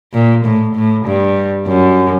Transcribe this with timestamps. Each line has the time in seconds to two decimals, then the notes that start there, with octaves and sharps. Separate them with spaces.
0.13 A#2
0.45 A2
0.75 A2
1.05 G2
1.67 F#2